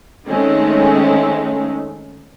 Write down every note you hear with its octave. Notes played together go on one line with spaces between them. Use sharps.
D#3 G#3 A3 C4 C#4 D#4